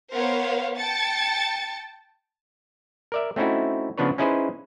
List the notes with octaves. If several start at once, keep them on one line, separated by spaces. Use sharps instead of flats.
B3 A#4 C5 C#5 F5
G5 A5 A6 C#7
A#4 D5 E5
A3 C4 C#4 D#4 E4 F#4
C#3 F3 B3 D4 B4 C#5
C#4 D#4 E4 G#4 B4 C5